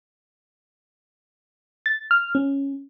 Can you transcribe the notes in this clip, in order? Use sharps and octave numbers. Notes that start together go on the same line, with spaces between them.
A6
F6
C#4